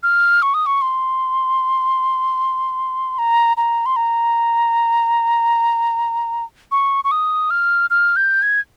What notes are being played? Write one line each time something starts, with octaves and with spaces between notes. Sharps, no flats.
F6
C#6
D#6
C#6
C6
A#5
A#5
C6
A#5
C#6
C#6
D#6
F6
F6
G6
G#6